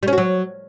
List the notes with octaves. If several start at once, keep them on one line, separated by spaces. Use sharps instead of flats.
G3
C#4
F#4
F#3